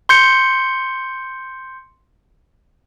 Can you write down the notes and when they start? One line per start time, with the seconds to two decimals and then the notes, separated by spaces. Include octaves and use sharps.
0.09 C6 G6 C#7